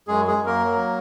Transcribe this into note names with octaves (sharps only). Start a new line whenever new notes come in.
F#2 G#3 G#4
G#3 G#4
F#2
A#3 A#4
F#3